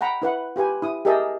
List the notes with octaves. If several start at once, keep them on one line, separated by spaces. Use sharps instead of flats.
F#5 G5 A#5 B5
E4 B4 F#5
F4 G4 B4 G#5
E4 D#6
G4 G#4 A#4 D#5 E5 A5